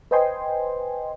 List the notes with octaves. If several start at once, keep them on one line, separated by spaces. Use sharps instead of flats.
B4 C5 D#5 G5 G#5 C6